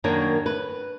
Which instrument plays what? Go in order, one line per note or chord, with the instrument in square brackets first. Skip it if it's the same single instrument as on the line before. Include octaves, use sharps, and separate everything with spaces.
[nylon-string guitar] F#2 D#3 A#3 D4 C#5
B4